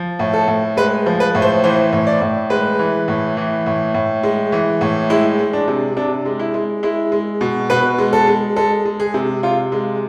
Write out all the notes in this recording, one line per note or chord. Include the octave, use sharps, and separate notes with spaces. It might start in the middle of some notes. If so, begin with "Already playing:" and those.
Already playing: F3
A2
A4
A2
G#3 B4
F3
B4
A2
C5
E3 C5
A2
D5
A2
G#3 B4
E3
A2
E3
A2
A2
G#3
E3
A2
G#3 E4
G#3
D4
C3
C3 D4
G#3
E4
G#3
G#3 E4
G#3
B2
B2 B4
G#3
A4
G#3
G#3 A4
G#3
G#4
C3
C3 F4
G#3